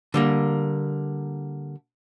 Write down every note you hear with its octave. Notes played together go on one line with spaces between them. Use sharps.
D3 G3 A#3